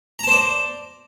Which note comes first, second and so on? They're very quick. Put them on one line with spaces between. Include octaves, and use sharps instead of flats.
A#5 A5 C5 D5